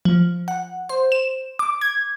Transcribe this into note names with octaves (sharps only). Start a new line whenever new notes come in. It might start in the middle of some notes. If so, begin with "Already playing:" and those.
F3
F#5
C5
E7
D6
G#6